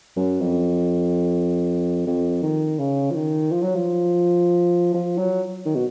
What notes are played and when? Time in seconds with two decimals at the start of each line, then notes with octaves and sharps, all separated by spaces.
0.16 F#2
0.41 F2
2.07 F2
2.43 D#3
2.79 C#3
3.11 F3
3.15 D#3
3.51 F3
3.63 F#3
3.76 F3
4.94 F3
5.18 F#3
5.66 D#3
5.76 B2